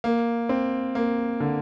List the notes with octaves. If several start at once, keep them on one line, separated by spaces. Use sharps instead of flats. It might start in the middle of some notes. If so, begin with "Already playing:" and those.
A#3
C4
A#3
D3